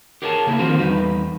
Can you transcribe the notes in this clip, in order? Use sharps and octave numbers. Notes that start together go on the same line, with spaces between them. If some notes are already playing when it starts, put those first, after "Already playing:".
G4 G#4 A#4 C#5 D#5 A5
C#3 A#3 D4 E4
D3 D#3 F3 C4 F4 F#4
E2 G3 D#4 B4